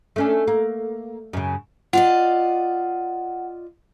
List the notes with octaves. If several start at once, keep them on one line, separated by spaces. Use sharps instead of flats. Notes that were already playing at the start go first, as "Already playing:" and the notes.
A3 C#4 D4
A#3
F#2 C#3
F4 D5 D#5 F#5